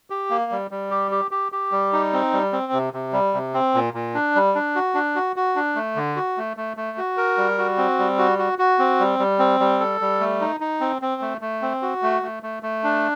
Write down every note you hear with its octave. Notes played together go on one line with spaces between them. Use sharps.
G4
A#3
G3
G3
G4
G4
G4
G4
G3
D#4
C4
G3
C4
C3
C3
G3
C3
C4
A#2
A#2
D4
G3
D4
F#4
D4
F#4
F#4
D4
A3
D3
F#4
A3
A3
A3
F#4
A#4
G3
F#4
C4
G3
F#4
F#4
F#4
C4
G3
G3
C4
G3
A4
G3
A3
D#4
D#4
C4
C4
A3
A3
C4
F#4
A3
A3
A3
A3
D4